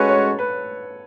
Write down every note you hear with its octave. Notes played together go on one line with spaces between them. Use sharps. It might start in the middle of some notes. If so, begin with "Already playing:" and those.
Already playing: G#3 C#4 F#4 A4 B4
C#5
B4